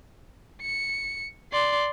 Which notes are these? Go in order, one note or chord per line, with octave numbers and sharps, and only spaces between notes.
C#7
D5 C6